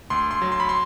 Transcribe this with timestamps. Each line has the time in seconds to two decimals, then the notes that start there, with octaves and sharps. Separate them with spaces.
0.10 D2 C6
0.31 C6
0.42 F#3
0.52 C6
0.60 B5
0.69 C6